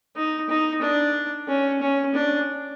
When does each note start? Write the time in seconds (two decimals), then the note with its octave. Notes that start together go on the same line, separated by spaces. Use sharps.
0.16 D#4
0.49 D#4
0.81 D4
1.48 C#4
1.81 C#4
2.14 D4